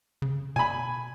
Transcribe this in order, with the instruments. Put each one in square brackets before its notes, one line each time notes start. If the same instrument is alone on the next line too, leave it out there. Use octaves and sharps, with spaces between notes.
[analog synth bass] C#3
[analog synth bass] B2 [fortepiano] G#5 B5